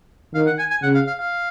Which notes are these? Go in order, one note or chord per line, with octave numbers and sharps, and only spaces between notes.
D#3 F5
F#5
G#5
G#5
C#3 F#5
F5
F5
F5